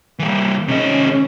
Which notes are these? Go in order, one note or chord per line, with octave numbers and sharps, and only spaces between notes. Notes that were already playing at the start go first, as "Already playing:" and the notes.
E3 G3 A#3
C3 D#3 G#3 C#4 D#5